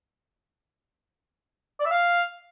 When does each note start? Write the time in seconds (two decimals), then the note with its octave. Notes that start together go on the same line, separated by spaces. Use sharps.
1.80 D5
1.85 E5
1.91 F5